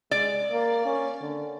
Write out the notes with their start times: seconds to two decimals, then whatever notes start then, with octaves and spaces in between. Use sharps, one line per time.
0.11 G#3 D5
0.52 A#3
0.85 C#4
1.21 D3